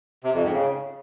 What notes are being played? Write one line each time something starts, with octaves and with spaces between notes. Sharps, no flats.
C3
F2
G#2
C#3